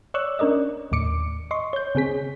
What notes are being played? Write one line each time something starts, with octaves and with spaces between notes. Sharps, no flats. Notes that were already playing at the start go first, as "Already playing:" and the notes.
C#5 D5 C#6 E6 F#6
C#4 D4 A#4 D5 D#5
D#2 A2 D6 C#7
D#5 C6 C#6
C#5 G6
C#3 C4 G#4 B6